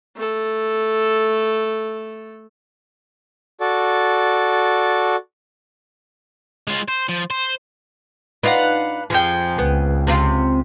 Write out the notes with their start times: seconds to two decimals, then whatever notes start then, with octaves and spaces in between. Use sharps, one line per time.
0.16 A3 A4
3.60 F#4 A4 D5
6.68 G#3 F4
6.88 C5
7.09 F3
7.31 C5
8.44 D4 D#4 F4 B4 F5 F#5
9.10 F2 F3 G#4 G5
9.58 C#2 B3
10.07 C3 C4 F4